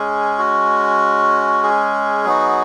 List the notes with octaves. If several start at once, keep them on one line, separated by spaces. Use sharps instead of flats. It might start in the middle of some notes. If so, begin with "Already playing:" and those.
Already playing: G#3 C#4 G#4
F#4
G#4
F#3 B3 D#4 F#4